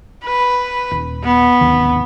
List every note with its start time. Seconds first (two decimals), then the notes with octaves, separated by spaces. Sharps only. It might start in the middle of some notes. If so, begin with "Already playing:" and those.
0.25 B4
0.91 D#1
1.24 B3
1.61 D1 G#1 D#2